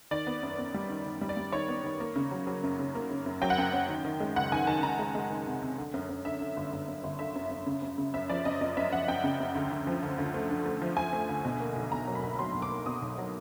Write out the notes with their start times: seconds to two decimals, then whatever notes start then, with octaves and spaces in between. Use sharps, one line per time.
0.11 D#3 D5
0.27 B3
0.43 F#2
0.58 B3
0.74 G3
0.89 D#3
1.06 D#3
1.21 G3
1.29 D5
1.37 G3
1.52 D#3 C#5
1.69 B3
1.84 D#3
2.00 A#3
2.16 C#3
2.31 F#3
2.47 F#3
2.63 F#2
2.79 C#3
2.95 A#3
3.10 C#3
3.26 F#2
3.42 F#3 G5
3.50 F#5
3.58 F#2 G5
3.73 F#2
3.89 D#3
4.05 D#3
4.20 G#3
4.36 C#2 F#5
4.52 D#3 G#5
4.67 D#3 A5
4.83 D#3 A#5
4.99 G#3
5.15 G#3
5.31 D#3
5.46 C3
5.62 C3
5.78 D3
5.94 F#2
6.09 F#2
6.25 D3 E5
6.41 D3
6.57 G1
6.72 G1
6.88 F#2
7.03 G1
7.19 D3 E5
7.35 F#2
7.51 F#2
7.66 C#3
7.82 F#2
7.98 C#3
8.14 F#2 E5
8.29 F3 D5
8.45 F#2 D#5
8.61 F#2 D#5
8.77 F#2 E5
8.92 F#2 F#5
9.08 F#2 G5
9.24 C#3
9.40 F#2
9.55 D2
9.71 D2
9.87 F3
10.03 D2
10.18 D2
10.34 A3
10.50 D3
10.66 A3
10.82 F3
10.97 F3 G#5
11.13 A3
11.29 D2
11.45 B2
11.60 A#3
11.76 B1
11.91 B2 A#5
12.07 F#3
12.15 B5
12.23 B1
12.39 F#3 C6
12.54 B1
12.62 D6
12.71 A#3
12.86 B2 D#6
13.02 B1
13.18 F#3